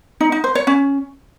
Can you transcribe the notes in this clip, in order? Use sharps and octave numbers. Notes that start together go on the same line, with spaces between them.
D#4
D#4
C5
C#5
C#4